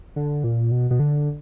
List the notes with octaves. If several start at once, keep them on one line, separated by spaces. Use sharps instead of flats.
D3
A#2
B2
B2
D3